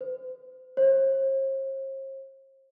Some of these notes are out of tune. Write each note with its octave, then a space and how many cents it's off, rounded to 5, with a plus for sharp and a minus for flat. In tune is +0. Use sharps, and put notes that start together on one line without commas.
C5 -40
C5 +45